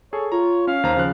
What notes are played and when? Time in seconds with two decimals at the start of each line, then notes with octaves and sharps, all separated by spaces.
0.13 G#4 A4 C#5
0.32 F4 C#5 A#5
0.67 C#4 F5
0.83 D#2 C5 A#5
0.96 C#3 F3 F#6